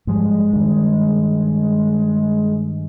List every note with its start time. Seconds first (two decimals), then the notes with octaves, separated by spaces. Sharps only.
0.07 G#2 F3 G3 G#3
0.53 G2 D#3